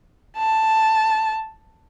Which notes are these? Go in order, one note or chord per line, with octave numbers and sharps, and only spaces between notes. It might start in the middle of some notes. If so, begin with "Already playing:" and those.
A5